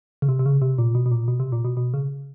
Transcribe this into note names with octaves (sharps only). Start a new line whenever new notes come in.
C#3
C3
C3
C#3
C3
A#2
B2
B2
A#2
B2
C3
A#2
B2
B2
C#3